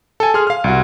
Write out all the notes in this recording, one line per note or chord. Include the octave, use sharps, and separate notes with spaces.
A4 G#5
G#4 C6 F6
F5 F6
C2 F#4